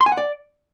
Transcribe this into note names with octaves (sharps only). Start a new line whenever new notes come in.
C6
G#5
F#5
D5